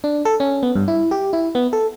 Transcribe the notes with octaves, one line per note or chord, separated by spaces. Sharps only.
D4
A4
C#4
B3
G2
E4
G4
E4
B3
A4